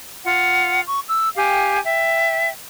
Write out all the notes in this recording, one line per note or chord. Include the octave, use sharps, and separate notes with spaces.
F4 F#5
C#6
E6
G4 F5 G5 G#5
E5 G5